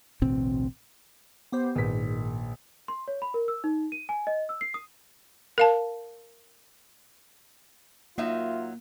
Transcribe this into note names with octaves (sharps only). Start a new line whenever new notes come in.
A1 D2 B2 C4
B3 G4 C5
A#1 G#2 D#3 B4 B6
C6
C#5
B5
A#4
E6
D#4
D#7
G#5
D#5
E6
C7
D#6
A#4 F5 A5
F#3 A#3 D#4 F4 E5